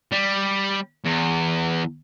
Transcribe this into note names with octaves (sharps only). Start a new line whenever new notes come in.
G3
E2